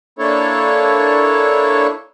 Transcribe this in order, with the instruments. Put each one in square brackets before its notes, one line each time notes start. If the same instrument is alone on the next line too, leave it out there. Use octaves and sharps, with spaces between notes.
[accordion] A#3 D4 E4 A4 C#5